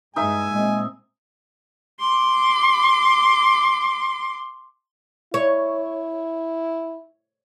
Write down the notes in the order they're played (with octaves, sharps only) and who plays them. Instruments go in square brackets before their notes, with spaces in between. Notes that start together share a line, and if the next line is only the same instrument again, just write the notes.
[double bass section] G2 G#3 [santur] D#4 E5 [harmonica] G#5
[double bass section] A#2 C4 [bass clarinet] G#3
[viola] C6 D6
[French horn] E4 [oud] C#5